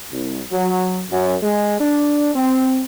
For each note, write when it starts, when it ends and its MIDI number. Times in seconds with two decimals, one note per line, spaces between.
0.11 0.42 36
0.52 1.04 54
1.10 1.36 42
1.42 1.76 56
1.80 2.31 62
2.35 2.82 60